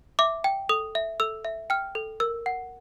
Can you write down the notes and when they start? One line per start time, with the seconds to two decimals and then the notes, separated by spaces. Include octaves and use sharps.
0.19 E5 D6
0.44 G5
0.69 A4 D#6
0.95 E5
1.20 A4 E6
1.45 E5
1.70 G5 F6
1.95 A4
2.20 A#4 E6
2.46 F#5